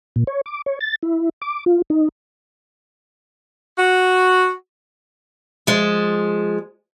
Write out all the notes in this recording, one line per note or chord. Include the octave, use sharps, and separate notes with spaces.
A#2
C#5
D6
C#5
A6
E4
D6
F4
D#4
F#4
F3 G#3